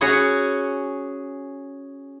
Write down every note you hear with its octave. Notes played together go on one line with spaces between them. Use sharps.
C#4 F#4 G#4 C#5 B5